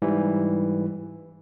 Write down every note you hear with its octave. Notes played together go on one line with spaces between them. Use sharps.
G#2 E3 G3